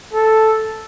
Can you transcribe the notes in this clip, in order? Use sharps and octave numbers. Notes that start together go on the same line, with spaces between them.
A4